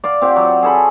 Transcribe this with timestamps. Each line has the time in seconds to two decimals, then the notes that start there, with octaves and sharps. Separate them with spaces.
0.04 D5 F5 D6
0.22 C4 G4 F#5
0.36 F#3
0.62 G#4 A4 B5